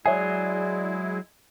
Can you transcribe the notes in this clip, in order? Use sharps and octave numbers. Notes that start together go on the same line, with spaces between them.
F#3 G#3 E4 G#4 C#5 D5 E5 G#5